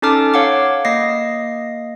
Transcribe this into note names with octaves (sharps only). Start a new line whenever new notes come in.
C#4 D#4 A4 A5 D6 F6
C#5 F5 F#5 D6
A#3 D#5 A#6 C7